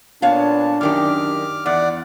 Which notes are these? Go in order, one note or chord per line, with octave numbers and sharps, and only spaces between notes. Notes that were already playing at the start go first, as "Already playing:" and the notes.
A#2 B3 D4 C#5 F5 A5
F#2 D#3 G4 D6 F6
E2 D5 F#5 D6